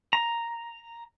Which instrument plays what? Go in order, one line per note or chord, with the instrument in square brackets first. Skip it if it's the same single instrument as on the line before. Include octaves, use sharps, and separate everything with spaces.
[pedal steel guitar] A#5